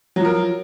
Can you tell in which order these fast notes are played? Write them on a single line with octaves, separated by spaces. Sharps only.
F#3 F3 A#4